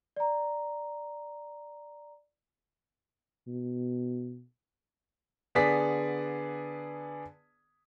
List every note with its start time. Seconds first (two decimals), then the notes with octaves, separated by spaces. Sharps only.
0.16 D5 A#5
3.48 B2
5.55 D3 B3 G#4 D5 B6